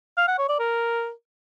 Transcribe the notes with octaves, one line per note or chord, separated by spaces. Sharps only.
F5
F#5
C#5
D5
A#4